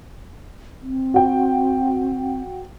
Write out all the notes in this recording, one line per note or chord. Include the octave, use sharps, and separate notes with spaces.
C4
F#4 G5